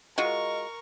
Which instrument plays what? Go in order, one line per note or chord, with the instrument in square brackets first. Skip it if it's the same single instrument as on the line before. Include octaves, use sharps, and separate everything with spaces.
[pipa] G#3 F4 F#4 [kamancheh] A#4 C#6 [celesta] D#5